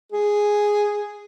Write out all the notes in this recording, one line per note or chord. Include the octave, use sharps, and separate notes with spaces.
G#4